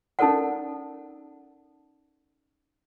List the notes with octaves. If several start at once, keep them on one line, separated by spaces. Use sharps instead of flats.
C#4 D#4 A4 A#4 D5 F#5